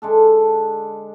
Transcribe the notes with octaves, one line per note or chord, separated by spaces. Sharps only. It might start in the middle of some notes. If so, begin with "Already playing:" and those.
D3 G#3 D4 A4